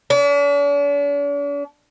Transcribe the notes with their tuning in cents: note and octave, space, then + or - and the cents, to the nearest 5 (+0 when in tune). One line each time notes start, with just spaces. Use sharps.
D4 -45